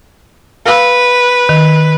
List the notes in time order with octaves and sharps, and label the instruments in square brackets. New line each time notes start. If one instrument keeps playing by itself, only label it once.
[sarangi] B4 [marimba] F5 E6
[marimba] D#3